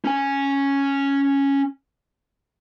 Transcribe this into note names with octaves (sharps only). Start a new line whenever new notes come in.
C#4 G#5